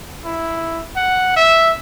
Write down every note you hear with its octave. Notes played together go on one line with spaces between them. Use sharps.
E4
F#5
E5